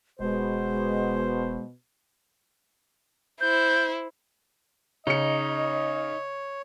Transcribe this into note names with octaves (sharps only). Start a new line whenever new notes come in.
E1 B2 G#3 C5
E4 C5 G6
C#3 D#4 C#5 D#5 C#7